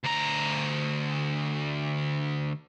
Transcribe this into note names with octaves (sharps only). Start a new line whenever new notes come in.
D2 A#5